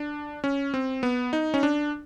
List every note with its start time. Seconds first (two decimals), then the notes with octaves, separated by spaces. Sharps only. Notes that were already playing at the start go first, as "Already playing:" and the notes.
Already playing: D4
0.44 C#4
0.74 C4
1.03 B3
1.33 D#4
1.54 C#4
1.63 D4